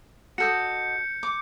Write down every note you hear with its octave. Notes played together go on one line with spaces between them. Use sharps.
F#4 A4 D#5 G6 C#7
D6